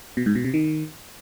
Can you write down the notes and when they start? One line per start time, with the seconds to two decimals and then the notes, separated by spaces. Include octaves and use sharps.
0.17 B2
0.26 G#2
0.35 B2
0.45 C3
0.54 D#3